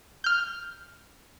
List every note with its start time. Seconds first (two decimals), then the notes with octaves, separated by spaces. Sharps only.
0.24 F6 G6